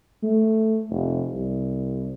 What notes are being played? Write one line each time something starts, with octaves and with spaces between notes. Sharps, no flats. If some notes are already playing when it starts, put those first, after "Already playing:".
A3
F1
C2